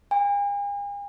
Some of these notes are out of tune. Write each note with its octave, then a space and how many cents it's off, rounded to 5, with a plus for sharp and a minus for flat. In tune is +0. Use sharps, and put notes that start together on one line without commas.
G#5 -45